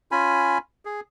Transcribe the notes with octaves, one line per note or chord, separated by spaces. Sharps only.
C#4 F4 G#5 B5
G#4